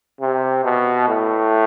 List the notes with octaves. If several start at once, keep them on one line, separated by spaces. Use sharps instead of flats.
C3
B2
A2